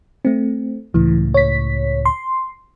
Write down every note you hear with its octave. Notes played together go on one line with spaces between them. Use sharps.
A3 C4
C#2 A2 E3
C#5 B6
C6